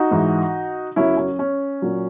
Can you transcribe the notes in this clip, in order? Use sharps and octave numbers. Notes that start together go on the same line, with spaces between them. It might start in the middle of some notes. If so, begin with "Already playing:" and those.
Already playing: D#4 F#4
G#2 E3
F#2 C#3 F#3 C#4 E4
C#4
C#4
A#2 F#3